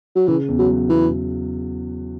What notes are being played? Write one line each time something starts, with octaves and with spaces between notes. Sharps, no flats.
F#3
C#3 E3
E2
F#3
F#3
E2 E3
C#3